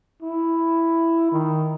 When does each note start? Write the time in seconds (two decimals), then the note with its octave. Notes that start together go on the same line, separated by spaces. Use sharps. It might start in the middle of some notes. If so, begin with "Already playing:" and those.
0.22 E4
1.32 D#3